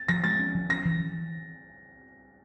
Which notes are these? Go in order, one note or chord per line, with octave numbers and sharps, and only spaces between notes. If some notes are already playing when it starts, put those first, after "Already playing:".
Already playing: A6
F3 A#6
G#3 A6
C#4
F3
C#4 A#6
E3
E3